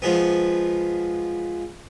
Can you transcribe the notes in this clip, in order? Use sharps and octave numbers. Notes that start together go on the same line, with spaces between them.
F3 G#3 B3